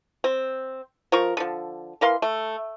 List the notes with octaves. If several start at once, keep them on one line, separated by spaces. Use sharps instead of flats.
C4
F3 A#4 C#6
D3 F3
E3 A#4 F5 C6
A3